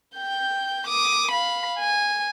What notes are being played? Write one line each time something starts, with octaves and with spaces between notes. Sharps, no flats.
G5 G6
D6 D#6
F5 B5
G#5